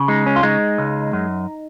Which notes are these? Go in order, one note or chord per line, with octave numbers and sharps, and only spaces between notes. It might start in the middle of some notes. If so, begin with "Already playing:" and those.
Already playing: C#3
G#3 D#4
C#4
F4
G#3 D#4
C#2
F#2